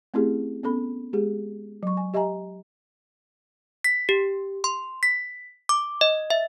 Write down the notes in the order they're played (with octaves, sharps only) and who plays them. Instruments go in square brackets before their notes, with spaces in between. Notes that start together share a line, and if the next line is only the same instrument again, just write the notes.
[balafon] A3 C4 C#4 E4 G4 G#4
B3 C#4 A4 B5
G#3 G4 G#4
F#3 C#6
G#5
G4 D#5 E5 G#5 A#5
[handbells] B6
G4
C6
B6
D6
D#5
E5